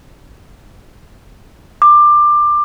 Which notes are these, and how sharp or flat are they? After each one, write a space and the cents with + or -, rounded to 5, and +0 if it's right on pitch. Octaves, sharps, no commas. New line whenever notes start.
D6 +20